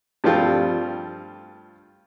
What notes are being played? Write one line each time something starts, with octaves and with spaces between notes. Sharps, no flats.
G2 F3 G3 A3 C4 F4